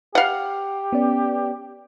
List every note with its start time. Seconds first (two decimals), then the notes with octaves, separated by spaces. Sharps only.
0.15 G4 F5 F#5
0.93 B3 C#4 D5